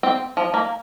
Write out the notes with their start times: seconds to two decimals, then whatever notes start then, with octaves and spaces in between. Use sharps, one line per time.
0.03 C4
0.37 F3
0.54 A#3